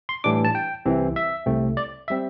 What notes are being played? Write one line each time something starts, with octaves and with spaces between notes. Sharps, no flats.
C6
A2 E3 G3 D4 D6
A5
G5
C2 C3 E3 C4
E5
C2 C3 A3 C4
D5
E5
G3 C4